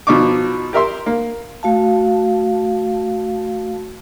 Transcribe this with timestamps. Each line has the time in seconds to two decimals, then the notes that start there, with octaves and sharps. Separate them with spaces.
0.07 B2 F3 D#4 C#6 D6
0.73 G4 A#4 E5 C6
1.06 A#3
1.63 A3 F#4 F5 A5